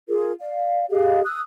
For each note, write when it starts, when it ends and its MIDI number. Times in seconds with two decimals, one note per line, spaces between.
0.09 0.32 65
0.09 0.32 68
0.09 0.32 70
0.40 0.85 74
0.40 0.85 77
0.90 1.22 67
0.90 1.22 68
0.90 1.22 75
0.90 1.22 77
1.25 1.40 87
1.25 1.40 88
1.25 1.40 90